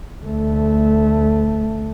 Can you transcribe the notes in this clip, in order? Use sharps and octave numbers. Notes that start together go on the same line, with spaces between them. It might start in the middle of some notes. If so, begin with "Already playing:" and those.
D2 A3